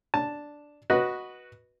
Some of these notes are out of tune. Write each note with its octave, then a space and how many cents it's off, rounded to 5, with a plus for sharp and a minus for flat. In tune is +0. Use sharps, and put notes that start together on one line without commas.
D4 +0 A5 +0
F#4 +0 B4 -15 D#5 +0